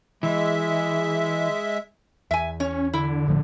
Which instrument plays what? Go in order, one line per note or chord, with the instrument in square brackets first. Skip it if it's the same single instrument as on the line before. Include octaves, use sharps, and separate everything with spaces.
[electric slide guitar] E3 [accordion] G#3 E5
[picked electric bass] E2 [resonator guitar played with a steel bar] E5 G#5
[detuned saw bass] C#4 [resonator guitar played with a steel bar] C#5
[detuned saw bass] D3 [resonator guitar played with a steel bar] E4
[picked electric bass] A#1 A2 F3